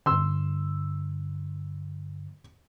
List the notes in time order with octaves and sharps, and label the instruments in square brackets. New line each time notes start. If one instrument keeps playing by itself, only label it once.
[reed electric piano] G2 D3 [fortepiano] C6 E6